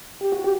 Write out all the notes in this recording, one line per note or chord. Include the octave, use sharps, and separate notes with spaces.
G4
F#4
G4